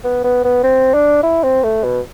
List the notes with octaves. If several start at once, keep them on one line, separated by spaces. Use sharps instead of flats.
B3
B3
B3
C4
D4
E4
C4
A3
B2